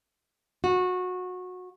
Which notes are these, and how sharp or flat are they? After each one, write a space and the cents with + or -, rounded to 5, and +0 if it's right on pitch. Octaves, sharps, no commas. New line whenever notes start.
F#4 -20